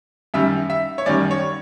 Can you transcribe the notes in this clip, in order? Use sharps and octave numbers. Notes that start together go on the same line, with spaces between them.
F#2 D#3 G3 E5
E5
C#5
F#2 D#3 G3 D5
C#5